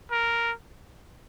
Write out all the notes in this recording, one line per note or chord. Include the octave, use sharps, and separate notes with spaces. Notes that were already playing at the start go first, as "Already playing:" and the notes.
A#4